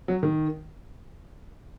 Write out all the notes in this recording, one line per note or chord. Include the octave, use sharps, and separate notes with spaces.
F#3
D#3